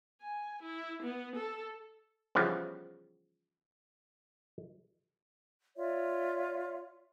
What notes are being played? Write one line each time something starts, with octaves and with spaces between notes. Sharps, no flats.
G#5
E4
B3
A4
C#3 E3 F3 G3 B3
F4 C#5 D5 E5